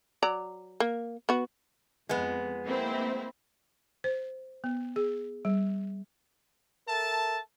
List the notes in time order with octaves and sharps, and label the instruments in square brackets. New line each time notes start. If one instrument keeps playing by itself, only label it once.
[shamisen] F#3 D5 A#5
A#3
B3 F#4
[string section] F2 [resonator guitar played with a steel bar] G#3 B3
[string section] A#3 C4 E4
[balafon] C5
B3
G#4
G3
[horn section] A4 A#4 E5 A5